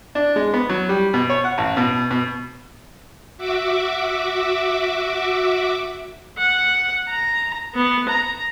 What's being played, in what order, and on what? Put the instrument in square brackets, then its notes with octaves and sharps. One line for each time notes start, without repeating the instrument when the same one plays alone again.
[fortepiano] D4
G#3
B3
F#3
G3
B2
C#5
F#5
A1
B2
B2
[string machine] F#4 E5 D6
[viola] F#5
A#5
B3
A#5